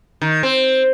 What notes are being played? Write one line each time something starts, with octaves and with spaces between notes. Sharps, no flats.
D#3
C4